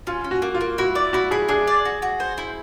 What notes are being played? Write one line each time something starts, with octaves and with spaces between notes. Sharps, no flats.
C#4 F4
C#4
F#4
A#3
F4
A#3
E4 F#4
D5
E4 F#4
E4 G#4
D4 G#4
D5
F#4
F#4
C5
E4